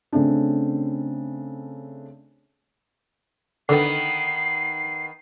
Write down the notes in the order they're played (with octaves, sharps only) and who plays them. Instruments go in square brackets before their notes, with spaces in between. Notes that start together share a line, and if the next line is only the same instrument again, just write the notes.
[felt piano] C#3 A3 C4 D4
[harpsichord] D3 [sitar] D#3 B3 [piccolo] C7